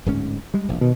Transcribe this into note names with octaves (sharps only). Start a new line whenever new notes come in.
D1 G#2 C#4
G3 G#3
E1 A#1
B2 D#3